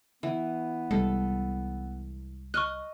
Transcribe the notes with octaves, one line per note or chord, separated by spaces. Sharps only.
E3 B3
C2 G3 G#3 A4
D#5 C#6 F6 F#6